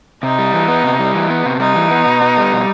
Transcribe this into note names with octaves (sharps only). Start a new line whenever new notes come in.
C3 D#4
G3
E3
B3
C3
G3
E3
B3
C3
G3 D#4
E3
B3
B2
B3
G3
B2